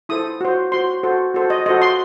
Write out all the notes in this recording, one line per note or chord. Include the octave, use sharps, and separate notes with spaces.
E4 A4 C5 D#6
F#4 C5
F#4 C5 C6
F#4 A4 C5
F#4 A4 C5
D#5
F#4 A4 C5 D#5
C6